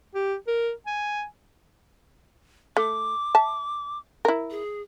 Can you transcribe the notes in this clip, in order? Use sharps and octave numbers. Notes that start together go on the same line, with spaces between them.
G4
A#4
G#5
A3 D6
E5 A5
E4 A#4
G#4